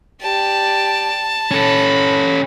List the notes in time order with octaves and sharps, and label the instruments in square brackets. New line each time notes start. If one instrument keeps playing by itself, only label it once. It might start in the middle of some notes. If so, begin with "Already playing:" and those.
[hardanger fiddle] G4 D5 [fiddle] A5
[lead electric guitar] C#4 A4 [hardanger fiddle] C#5 B5